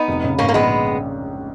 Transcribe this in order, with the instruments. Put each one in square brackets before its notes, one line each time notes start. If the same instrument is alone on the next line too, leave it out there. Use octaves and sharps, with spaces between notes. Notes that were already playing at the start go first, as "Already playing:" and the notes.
Already playing: [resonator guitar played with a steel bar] B3 D#4
[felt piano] F1
C#3
[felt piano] G#2 [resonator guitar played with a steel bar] A#3 C#4
[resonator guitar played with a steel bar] A#3
[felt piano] A#1 [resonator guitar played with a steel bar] G#3 B3